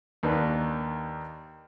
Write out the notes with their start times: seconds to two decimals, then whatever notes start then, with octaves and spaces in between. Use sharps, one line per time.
0.23 D#2 D#3 A#3 D4 B4